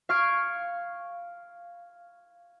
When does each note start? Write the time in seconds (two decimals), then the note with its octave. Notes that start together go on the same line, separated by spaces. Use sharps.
0.09 F5 C#6 F6 G#6 C7 D7